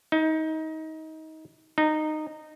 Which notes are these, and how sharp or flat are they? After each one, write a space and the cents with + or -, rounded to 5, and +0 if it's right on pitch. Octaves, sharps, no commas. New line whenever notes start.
D#4 +25
D#4 -15